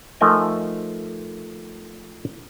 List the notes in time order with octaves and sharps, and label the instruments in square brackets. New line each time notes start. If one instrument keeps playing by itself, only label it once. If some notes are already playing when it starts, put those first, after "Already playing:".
[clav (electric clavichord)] F3 A3 D#4 A#4 D#5 G#5